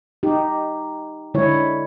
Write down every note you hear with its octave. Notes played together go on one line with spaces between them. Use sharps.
D#4 G4
D3 G#3 E4 C#5